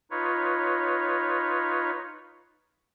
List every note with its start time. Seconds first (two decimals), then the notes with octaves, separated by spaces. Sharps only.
0.11 D#4 F4 B4 C#5